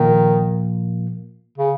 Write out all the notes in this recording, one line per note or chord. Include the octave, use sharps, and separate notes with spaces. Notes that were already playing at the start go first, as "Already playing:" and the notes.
Already playing: A#2 D#3 F3 A#3
C#3